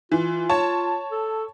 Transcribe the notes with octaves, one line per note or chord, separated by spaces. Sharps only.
E3 F4
C#5 A5
A4